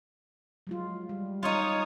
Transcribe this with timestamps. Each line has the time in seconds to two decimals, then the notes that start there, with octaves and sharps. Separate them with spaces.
0.67 F#3 G#3 F4
1.09 G3
1.43 D#4 F4 C#5 D#6